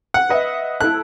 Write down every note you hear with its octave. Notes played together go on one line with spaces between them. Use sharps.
F#5
B4 D#5 E5
E4 A4 F#6